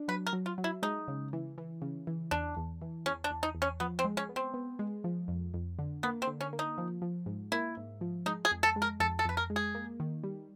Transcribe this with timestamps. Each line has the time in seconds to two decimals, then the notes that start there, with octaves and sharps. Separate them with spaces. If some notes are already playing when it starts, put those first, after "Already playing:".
Already playing: D4
0.08 F#3 B4
0.27 A#4
0.33 F#3
0.46 F4
0.58 F#3
0.64 E4
0.83 G#3 D#4
1.08 C#3
1.33 E3
1.58 E3
1.82 C#3
2.07 E3
2.31 E2 D4
2.57 E2
2.82 E3
3.06 E2 C#4
3.24 D4
3.31 E2
3.43 D#4
3.55 E2
3.62 C#4
3.80 F3 B3
3.99 C4
4.05 G#3
4.17 C#4
4.29 B3
4.36 C4
4.54 B3
4.79 G#3
5.04 F3
5.28 F2
5.54 F2
5.79 D3
6.03 A#3 B3
6.22 C4
6.27 D3
6.41 C#4
6.53 A#3
6.59 D#4
6.78 F3
7.02 F3
7.26 G#2
7.52 A#3 E4
7.77 G#2
8.01 F3
8.26 G#3 D#4
8.45 G#4
8.51 F2
8.63 A4
8.76 G#3
8.82 A#4
9.00 F2 A4
9.19 A4
9.25 F2 B4
9.37 A#4
9.50 G#3
9.56 G#4
9.75 A#3
10.00 D#3
10.23 G3